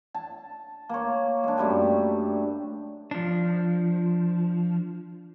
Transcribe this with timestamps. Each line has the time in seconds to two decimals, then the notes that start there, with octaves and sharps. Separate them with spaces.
0.15 A5
0.89 A#3 C#5
1.44 G#3 D4
1.57 F#2 G3 A3 G4
3.11 F3 D4